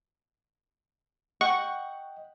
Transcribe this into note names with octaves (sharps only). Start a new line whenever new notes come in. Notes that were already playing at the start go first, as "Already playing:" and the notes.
D#5 F#5 G5 C#6